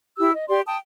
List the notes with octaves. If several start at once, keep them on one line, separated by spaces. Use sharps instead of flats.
E4 G4 E6
D#5
G4 D5 C6
G5 A5 D#6